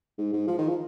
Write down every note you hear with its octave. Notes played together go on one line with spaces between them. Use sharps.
G#2
G#2
F3
D#3
F3